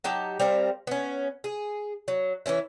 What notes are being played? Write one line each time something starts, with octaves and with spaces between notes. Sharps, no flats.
F#3 D#4 G4 A5
G3 C4 A#4 F5
B3 C#4
G#4
F#3
E3 G3 C#4 E4